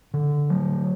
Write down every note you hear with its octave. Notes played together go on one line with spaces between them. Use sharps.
D3
F#3